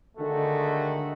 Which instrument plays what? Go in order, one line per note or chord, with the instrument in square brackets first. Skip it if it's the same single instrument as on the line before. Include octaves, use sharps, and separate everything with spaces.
[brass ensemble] D3 D#3 G#3 A3 F#4